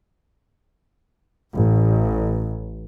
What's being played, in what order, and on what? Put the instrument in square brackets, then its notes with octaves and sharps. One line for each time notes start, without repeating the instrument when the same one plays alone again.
[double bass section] A1